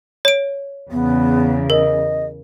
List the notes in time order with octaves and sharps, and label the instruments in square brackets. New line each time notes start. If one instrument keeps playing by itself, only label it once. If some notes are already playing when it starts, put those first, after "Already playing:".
[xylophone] C#5 D7
[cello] E2 C#3 [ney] B3
[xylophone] A#4 [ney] D#5